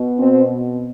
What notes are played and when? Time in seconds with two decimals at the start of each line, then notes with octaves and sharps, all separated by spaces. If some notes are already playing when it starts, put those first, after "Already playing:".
Already playing: B2
0.19 C4